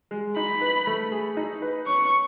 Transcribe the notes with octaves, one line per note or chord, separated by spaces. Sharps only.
G#3
D#4 B5
B4
A3
G#4
D#4
B4
C#4 C#6